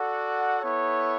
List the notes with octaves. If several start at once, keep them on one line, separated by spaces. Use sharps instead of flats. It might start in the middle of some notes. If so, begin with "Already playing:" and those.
Already playing: F#4 A4 D5 F#5
B3 E4 A4 C#5